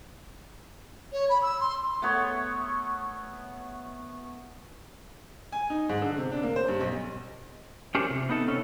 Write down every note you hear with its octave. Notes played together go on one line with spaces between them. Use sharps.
C#5
B5
E6
C6
A3 B3 C#5
G#5
D#4
G#2
D3
C3
D4
A#3
C5
G2
B1
C#4 D4 G4 A4 A#4 C5
C3
B3 D#4 A4
C3 C#4 A4